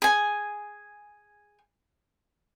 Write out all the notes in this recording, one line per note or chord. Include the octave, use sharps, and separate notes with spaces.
G#4 G#5